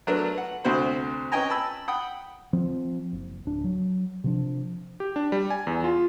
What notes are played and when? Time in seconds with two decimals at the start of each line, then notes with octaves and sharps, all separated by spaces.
0.07 F#3 A3 B3 D4 A#4 B4
0.34 B4 F#5
0.64 D2 C3 F#4 C5 B5
1.32 C#4 B4 D#5 G5 G#5 A#5
1.50 A5 B5 E6
1.88 F#5 G5 B5 D#6
2.53 F3 C4
3.13 F#1
3.45 D1 D4
3.64 F#3
4.24 C3 F3 D4
5.00 G4
5.16 D4
5.32 G3
5.50 G#5
5.67 E2
5.84 F4